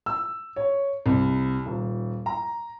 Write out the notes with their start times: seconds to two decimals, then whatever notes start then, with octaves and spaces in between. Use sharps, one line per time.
0.06 E6
0.56 C#5
1.06 C2
1.66 D#1
2.26 A#5